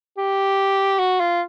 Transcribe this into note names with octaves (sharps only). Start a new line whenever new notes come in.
G4
F#4
F4